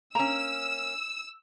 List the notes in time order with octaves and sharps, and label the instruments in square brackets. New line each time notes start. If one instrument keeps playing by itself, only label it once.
[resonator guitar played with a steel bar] A#3 C#4 [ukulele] A#5 [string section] E6